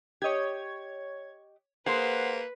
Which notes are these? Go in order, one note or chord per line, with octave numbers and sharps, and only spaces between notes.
G4 C#5 D#5 G#6
A#3 G#4 B4 C5 F#5 C6